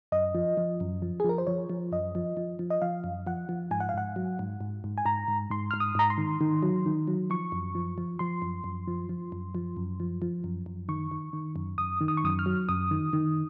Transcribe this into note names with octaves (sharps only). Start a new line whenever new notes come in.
F#2 D#5
F3
F3
F#2
F3
G#4
F3 A#4
C5
F3 C#5
F3
F#2 D#5
F3
F3
F3
D#5
F3 F5
F#2
F3 F#5
F3
G#2 G#5
F#5
F5
G#2 F#5
F#3
G#2
G#2
G#2
G#5
G#2 A#5
G#2
G#2 C6
G#2 F6
D#6
G#2 A#5
C6
D#3
D#3
F#3
D#3
F#3
F3 C#6
F#2
F3
F3
F3 C6
F#2
F#2
F3
F3
F#2
F3
F#2
F3
F3
F#2
F#2
D#3 C#6
D#3
D#3
F#2
F#2 D#6
D#3
D#6
C#6
F#2 D#6
F6
F#3
F#2 D#6
D#3
D#3